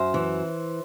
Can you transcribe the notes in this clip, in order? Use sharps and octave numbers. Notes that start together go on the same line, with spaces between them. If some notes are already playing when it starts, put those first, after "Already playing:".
Already playing: F#2 C5 E5
E3